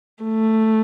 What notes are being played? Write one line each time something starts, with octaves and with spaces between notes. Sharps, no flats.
A3